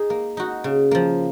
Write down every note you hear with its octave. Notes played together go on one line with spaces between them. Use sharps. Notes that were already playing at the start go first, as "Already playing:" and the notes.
Already playing: D#4 G#4
A#3
D#4 F#4
C#3
F3 A#3